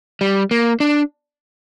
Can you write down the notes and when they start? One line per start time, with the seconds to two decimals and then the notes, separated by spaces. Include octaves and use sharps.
0.21 G3
0.51 A#3
0.80 D4